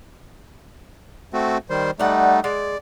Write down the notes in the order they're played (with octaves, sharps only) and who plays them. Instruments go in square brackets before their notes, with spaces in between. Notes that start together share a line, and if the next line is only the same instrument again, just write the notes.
[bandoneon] A3 C4 F#4
D#3 G3 C5
[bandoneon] G3 A3 D#4 [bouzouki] D5 F#5
[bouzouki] G#3 [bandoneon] D5